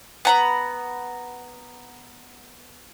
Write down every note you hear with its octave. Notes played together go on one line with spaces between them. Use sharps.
B3 A#5 B5